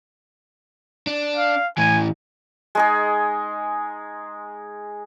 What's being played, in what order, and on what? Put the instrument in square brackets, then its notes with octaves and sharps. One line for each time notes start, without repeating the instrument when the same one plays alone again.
[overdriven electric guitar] D4
[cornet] F5
[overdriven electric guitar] A2 E3 [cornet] G#5
[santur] G#3 D#4 G#4